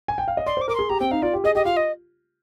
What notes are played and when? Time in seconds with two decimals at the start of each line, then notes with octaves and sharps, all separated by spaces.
0.08 G#5
0.18 G5
0.28 F5
0.37 D#5
0.46 D5 C6
0.57 C5 D6
0.68 A#4 D6
0.75 G#4 C6
0.89 G4 A#5
1.00 C4 G5
1.11 D#4 F5
1.22 F4 D5
1.33 G4
1.44 G#4 D#5
1.55 G4 D#5
1.65 F4 F5
1.77 D#5